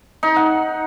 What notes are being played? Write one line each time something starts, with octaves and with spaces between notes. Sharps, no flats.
D#4
F#5